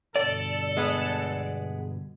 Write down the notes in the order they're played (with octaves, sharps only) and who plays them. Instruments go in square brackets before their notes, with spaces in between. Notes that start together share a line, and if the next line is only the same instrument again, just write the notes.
[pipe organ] G2 B2 D3 [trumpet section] A4 [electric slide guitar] D5
[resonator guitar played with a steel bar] G#3 B3